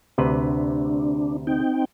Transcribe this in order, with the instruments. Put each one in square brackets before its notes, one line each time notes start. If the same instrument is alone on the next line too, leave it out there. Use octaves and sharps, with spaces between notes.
[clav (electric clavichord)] D2 C3 B4 [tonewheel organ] D4
[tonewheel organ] C4 D#4 G5